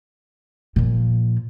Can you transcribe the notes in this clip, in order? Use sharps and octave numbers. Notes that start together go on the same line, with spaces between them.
A#2 F3